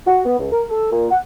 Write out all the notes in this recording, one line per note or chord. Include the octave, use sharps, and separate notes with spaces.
F#4
B3
C#2
A#4
A4
A#2
F#5